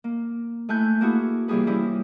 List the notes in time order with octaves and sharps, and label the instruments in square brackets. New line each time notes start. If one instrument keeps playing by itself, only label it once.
[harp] A#3
A3 E4 G#5 F#6 G6
A#3 E4 F#4 G#4
C3 E3 G3 A#3 G#4 B4
F3 G3 C#4 E4